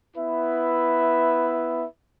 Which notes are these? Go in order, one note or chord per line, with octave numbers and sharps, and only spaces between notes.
B3 E4 B4 E5